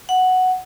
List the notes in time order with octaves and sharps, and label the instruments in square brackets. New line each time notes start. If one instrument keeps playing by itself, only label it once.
[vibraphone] F#5